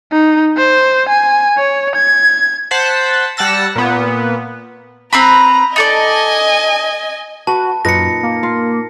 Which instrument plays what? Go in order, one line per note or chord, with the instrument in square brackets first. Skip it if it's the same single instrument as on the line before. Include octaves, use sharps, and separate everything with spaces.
[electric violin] D#4
C5
G#5
C#5
G#6
[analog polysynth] C5 F#5 A5 B6
G3 F#5 A5 E6 A#6
A#2 B3
[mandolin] C4 B4 B5 [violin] A#5
[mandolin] D#4 A4 D5 [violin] D#5 G#5
[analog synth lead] F#4 [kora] B4 [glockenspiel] A5
[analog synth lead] F#2 [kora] A#2 D#4 B4 [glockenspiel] A#6 C#7
[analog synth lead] A#3
[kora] F4